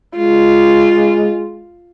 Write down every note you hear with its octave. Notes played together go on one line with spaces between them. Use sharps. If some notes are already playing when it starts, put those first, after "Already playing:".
G#3 F4